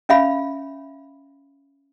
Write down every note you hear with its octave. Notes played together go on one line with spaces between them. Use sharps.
C#4 E5 F5 B5